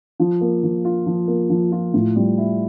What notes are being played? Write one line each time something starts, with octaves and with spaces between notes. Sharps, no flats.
F3
A#3
F3
F4
F3
A#3
F3
F4
A2
G3
E4